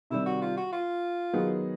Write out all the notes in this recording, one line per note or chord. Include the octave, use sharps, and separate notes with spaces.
C3 D#3 G3 E4
F#4
F4
F#4
F4
D#3 F#3 B3 D#4 G#4